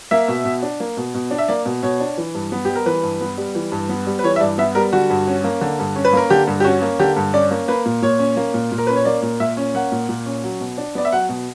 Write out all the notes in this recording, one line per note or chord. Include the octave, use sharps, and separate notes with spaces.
A#3 E5
B2
B2
D4
A#3
B2
B2
D4
E5
A#3 D5
B2
B2 C#5
D4
E3
G2
B3
G3 G4
A#4
E3 B4
G2
B3
G3
E3
G2
B3
G3
B4
E3 C#5
E5
G2 D5
B3 E5
G3 A#4
D3 F#4
G2
C#4
A#3
D3
G2
C#4
B4
A#3 A#4
D3 G4
G2
G4
C#4 F#4
A#3
D3 G4
G2
C#4 D5
A#3
A#3 B4
A#2
A#2 C#5
C#4
A#3
A#2
A#2
A#4
C#4 B4
C#5
A#3 D5
A#2
A#2 E5
C#4
A#3 F#5
A#2
A#2
C#4
F#3
B2
D4
B3 D5
E5
F#3 F#5
B2